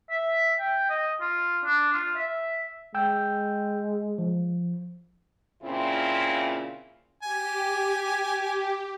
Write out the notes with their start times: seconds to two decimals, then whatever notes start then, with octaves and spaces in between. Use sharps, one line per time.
0.10 E5
0.60 G5
0.90 D#5
1.21 F4
1.65 D4
1.93 F4
2.16 E5
2.95 G#3 G5 E6 G6
4.18 F3
5.63 A#2 C#3 C4 E4 F4
7.23 G4 G#5